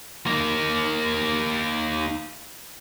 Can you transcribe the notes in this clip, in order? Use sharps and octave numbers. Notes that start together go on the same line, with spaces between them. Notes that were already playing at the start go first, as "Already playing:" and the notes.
A#3 D#4